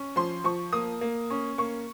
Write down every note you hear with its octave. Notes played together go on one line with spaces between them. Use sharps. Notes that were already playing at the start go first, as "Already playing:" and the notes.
Already playing: C#4
F3 C6
F3 C#6
A#3 D#6
A#3
C#4
A#3 C#6